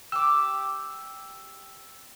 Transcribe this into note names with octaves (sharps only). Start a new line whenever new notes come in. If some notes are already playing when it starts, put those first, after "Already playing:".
G4 D6 E6